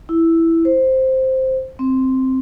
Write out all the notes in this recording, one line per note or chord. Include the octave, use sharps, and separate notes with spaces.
E4
C5
C4